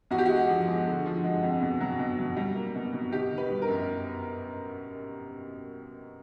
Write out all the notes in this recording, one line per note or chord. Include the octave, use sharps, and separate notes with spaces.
E2 F#4
G4
G#3 F#4
F3
G#3
D3
F3
G#3
F2
B2
F#3
B2
F#3
G3
A#3
B2
B2
D#3 G4
D#3
B4
G3
A#4
F#2